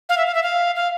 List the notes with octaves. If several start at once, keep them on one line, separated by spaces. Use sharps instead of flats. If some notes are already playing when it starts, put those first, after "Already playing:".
F5
E5
F5
E5
F5
F5